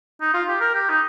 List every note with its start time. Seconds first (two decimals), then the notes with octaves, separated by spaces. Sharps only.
0.21 D#4
0.34 F4
0.48 G4
0.60 A#4
0.74 G4
0.89 D#4